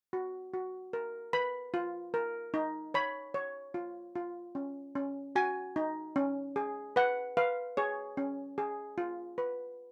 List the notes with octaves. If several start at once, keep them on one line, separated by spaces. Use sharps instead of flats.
F#4
F#4
A#4
B4 B5
F4
A#4
D#4
C#5 B5
C#5
F4
F4
C#4
C#4
F#4 G#5
D#4
C#4
G#4
B4 F#5
B4 F5
G#4 C#5
C#4
G#4
F4
B4